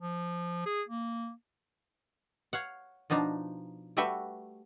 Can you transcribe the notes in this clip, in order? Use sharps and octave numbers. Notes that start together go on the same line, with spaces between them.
F3
G#4
A#3
C#5 F5 F#5
B2 F3 D4 D#4 A#5
G3 A3 F#4 B4 E5 G5